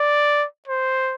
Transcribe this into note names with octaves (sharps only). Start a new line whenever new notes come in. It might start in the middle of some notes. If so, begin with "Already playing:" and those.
Already playing: D5
C5